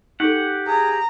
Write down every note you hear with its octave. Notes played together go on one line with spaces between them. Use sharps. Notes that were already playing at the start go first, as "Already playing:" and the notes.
D#4 G4 A4 F#5
G#4 A#5